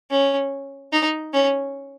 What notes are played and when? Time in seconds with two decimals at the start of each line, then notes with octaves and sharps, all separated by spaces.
0.10 C#4
0.92 D#4
1.33 C#4